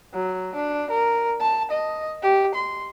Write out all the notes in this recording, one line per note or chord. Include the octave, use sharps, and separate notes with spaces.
F#3
D4
A#4
A5
D#5
G4
C6